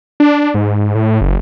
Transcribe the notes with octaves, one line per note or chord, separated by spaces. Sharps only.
D4
G#2
A2
F#1